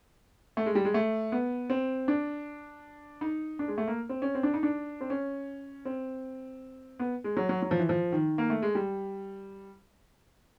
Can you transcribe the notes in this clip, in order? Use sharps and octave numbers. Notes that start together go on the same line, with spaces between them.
A3
G#3
G3
G#3
A3
B3
C4
D4
D#4
D4
G#3
A3
A#3
C4
C#4
C4
D4
D#4
D4
C4
C#4
C4
B3
G#3
F#3
F#3
F#3
F3
E3
F3
D#3
A#3
A3
G#3
G3